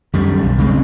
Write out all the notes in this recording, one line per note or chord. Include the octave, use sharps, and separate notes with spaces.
F#2 D#3 G3
B1
C#3 G#3 C4